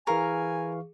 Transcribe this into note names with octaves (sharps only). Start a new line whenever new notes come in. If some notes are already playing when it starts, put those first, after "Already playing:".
E3 G#4 A#4 F5 G#5 C#6